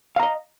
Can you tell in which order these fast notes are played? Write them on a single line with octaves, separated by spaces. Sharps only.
F5 A#5 D#5